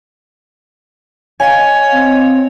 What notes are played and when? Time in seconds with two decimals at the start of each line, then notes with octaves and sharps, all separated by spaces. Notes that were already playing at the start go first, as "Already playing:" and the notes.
1.40 C#5 D#5 F5 G#5
1.92 C4